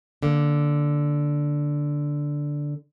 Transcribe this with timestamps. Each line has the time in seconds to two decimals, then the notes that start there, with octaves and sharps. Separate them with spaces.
0.23 D3 A#3